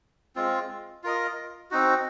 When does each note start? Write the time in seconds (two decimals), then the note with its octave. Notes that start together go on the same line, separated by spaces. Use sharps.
0.36 G#3 C4 F4
1.04 F4 A#4 D#5
1.71 C4 D#4 F#4